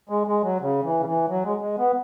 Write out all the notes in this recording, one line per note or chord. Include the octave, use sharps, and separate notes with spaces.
G#3
G#3
F#3
C#3
E3
C#3
E3
F#3
G#3
G#3
B3